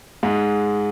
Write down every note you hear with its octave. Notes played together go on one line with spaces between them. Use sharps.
G#2 G#3